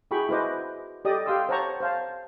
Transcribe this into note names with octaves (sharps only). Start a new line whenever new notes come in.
E4 F#4 G#4 G5 B5 C#6
E4 F#4 B4 C5 D#5 D6
G4 A4 D5 D#5 D#6
G4 F5 G5 C6 D#6 E6
C5 C#5 F#5 A5 A#5 C#6
C5 F5 A5